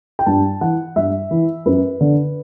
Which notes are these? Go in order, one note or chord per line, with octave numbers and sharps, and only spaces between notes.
G5
G2 A5
E3 F#5
G2 E5
E3
F#2 B4
D3